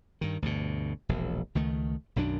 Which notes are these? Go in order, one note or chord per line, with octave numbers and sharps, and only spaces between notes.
G2 D#3
D2 G2 B2
E1 A#1
C#2 D#3 A3
B1 F#2 D#3 D4